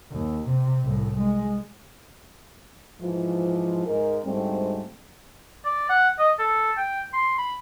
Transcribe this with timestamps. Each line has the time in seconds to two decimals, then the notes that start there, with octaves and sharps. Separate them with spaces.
0.12 D#2
0.49 C3
0.83 C2 A2
1.19 G#3
3.01 G#2 E3 F3
3.86 G#2 G#3 A#4
4.25 D2 G#2 G3 A3 C4
5.65 D5
5.90 F#5
6.19 D#5
6.39 A4
6.77 G5
7.13 C6
7.38 B5